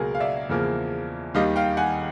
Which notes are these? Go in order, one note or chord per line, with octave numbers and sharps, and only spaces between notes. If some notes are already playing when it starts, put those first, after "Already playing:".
Already playing: C#2 B2 F#3 A#3 G#4 A#4
F5
D5 E5
E2 C#3 F3 A#3
D#2 D#3 G3 D#5 F5
F5 G5
F#5 G#5